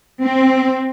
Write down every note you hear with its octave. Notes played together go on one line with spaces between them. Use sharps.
C4